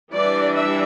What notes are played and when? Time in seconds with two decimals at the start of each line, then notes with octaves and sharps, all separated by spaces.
0.13 E3 G3 D4 D5
0.55 E5